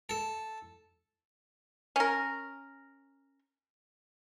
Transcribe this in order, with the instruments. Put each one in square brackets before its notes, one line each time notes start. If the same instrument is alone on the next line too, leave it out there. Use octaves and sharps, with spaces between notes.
[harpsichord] A4
[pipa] C#4 A#4